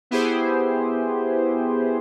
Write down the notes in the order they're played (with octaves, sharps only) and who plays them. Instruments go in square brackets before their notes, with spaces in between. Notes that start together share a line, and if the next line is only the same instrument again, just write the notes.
[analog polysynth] B3 E4 G4 G#4 C5